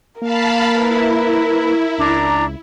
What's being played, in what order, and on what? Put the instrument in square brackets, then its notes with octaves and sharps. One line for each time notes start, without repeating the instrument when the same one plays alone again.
[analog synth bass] A#3 [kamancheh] A#4 [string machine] F5 A5 B5
[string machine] E4 [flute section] B4
[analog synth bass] C#2 [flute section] D4 A#5